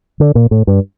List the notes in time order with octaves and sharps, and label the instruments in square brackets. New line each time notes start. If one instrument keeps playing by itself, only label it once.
[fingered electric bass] D3
A#2
A2
G2